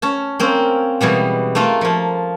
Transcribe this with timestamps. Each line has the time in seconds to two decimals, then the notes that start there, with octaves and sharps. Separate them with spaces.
0.02 C#4 A5
0.39 A#3 C4 C#4
1.01 B2 E3 G3 G#3
1.55 A3 A#3 F4 A#4
1.81 F3 A#3